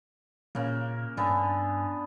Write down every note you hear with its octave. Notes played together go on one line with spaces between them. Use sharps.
A#2 C#3 A#3
G2 D3 B3 G#5